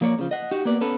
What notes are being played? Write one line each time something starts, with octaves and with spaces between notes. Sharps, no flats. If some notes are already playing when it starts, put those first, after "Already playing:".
F3 A#3 D4 C#5 D5
C#3 F3
D#5 F#5
D#4 F#4 G4
A#3 B3 D5
B3 C#4 A4 B4